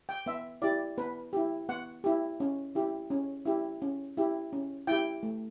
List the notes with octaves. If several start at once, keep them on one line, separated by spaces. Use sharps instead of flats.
G5
B3 E5
E4 G4 D5
B3 B4
E4 G4
B3 F#5
E4 G4
C#4
E4 G4
C#4
E4 G4
C#4
E4 G4
C#4
E4 G4 G5
A3